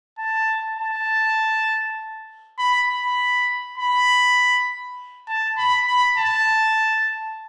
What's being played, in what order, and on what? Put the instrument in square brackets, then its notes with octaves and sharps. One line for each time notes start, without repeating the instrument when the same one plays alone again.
[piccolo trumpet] A5
A5
B5
B5
B5
A5
B5
B5
A5